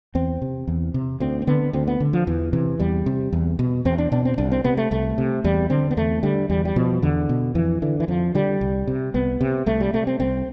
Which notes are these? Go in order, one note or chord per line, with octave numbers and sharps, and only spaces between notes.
E2 C4
C3
E2
C3
D2 C4
C4
D3 B3
D2 C4
B3
D3
F3
E2 E3
C3 E3
E2 G3
C3
E2
B2
E2 C4
D4
B2 D4
C4
C2 D4
C4
C3 B3
A3
C2 A3
C3
E2 G3
D3 C4
B3
E2 A3
D3 G3
E2 G3
G3
B2 F3
E2 D3
B2
F2 E3
D3 E3
E3
F2 F3
D3 G3
C2
C3
C2 B3
C3
C2 A3
G3
C3 A3
C4
C2 C4